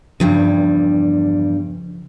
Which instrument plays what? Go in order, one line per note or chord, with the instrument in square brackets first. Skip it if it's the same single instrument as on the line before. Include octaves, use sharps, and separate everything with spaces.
[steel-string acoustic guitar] E2 G2 G3 [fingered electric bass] C#3 F3